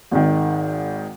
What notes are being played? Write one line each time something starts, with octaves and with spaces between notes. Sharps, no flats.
G#1 G#2 D#3